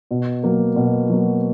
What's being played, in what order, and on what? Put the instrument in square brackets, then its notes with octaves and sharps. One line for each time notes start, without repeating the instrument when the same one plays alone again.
[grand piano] B2
F#3 A#3
B2
F#3 A#3